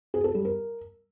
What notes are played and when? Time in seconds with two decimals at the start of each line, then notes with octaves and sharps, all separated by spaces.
0.14 G#4
0.24 A4
0.35 G3
0.45 A#4